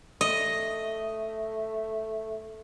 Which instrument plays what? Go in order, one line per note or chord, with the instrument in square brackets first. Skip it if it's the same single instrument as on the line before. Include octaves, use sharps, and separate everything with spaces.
[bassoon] A3 [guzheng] D#5